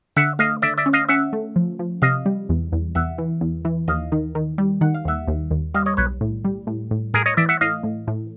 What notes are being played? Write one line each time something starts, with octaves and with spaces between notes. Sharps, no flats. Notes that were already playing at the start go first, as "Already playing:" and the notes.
D3 E5 F#5
A3 D#5 F5
D3 D5 E5
D5 E5
C#4
D#5 F5
C#4 E5 F#5
A3
F3
F3
C3 D#5 F5
G3
E2
E2
E2 E5 F#5
E3
E2
E3
D#2 D#5 F5
D#3
D#3
G3
D#3 F#5
F5
D#2 E5 F#5
D#2
D#2
G3 D#5 F5
C#5 D#5
B1 B4 C#5
A2
G3
A2
A2
A2 G#4 A#4
C#5 D#5
E3 D5 E5
E5 F#5
A2 D#5 F5
A2
A2